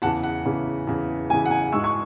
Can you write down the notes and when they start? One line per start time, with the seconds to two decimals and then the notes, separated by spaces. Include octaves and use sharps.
0.02 E2 C#3 E3 F#5 A5
0.24 F#5
0.45 E2 C#3 E3
0.87 E2 C#3 E3
1.30 E2 G#5
1.33 C#3 E3
1.45 F#5
1.51 G#5
1.72 G#2 E3 G#3 C#6 E6
1.84 C#6